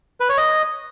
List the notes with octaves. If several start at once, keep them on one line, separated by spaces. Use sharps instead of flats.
B4
C#5
D#5